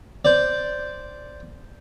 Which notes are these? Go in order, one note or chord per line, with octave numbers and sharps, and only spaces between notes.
C5 D5